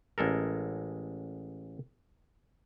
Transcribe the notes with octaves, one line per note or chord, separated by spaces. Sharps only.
A1 G#3 A4 A#4